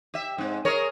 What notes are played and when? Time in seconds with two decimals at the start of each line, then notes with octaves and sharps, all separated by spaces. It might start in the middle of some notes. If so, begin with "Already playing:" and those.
0.14 G4 E5
0.38 G#2 C4
0.65 G#4 A#4 C#5